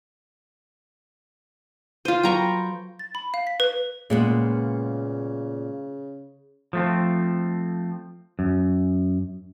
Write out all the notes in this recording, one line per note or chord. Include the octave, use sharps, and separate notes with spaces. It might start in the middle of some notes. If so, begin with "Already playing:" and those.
F4 C5 D#7
F#3 A4 B4 G5 A#5 C#6
A6
B5
F5
B6
B4
A#2 C#3 G#3 B3
F3 A3 C4
F#2